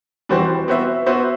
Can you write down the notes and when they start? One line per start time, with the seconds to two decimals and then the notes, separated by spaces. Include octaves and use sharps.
0.29 E3 G3 C4 F#4 C5
0.68 B3 F#4 C5 E5
1.06 B3 F#4 C5 E5